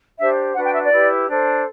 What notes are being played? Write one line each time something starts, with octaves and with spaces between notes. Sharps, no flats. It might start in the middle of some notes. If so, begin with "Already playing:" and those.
D4 G4 C5 E5
D4 F#4 B4 F#5
G5
E5
D5
E4 G4 B4
D4 A4 C5